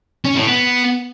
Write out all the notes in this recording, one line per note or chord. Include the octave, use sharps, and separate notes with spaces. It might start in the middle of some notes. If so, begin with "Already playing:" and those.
C#4
A2
B3